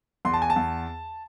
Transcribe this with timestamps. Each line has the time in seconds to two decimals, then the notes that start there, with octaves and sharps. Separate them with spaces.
0.25 E2 C6
0.34 A5
0.42 G#5
0.50 A5
0.56 E2